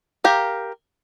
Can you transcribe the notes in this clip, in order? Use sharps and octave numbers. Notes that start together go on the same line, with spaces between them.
G4 A#4 F5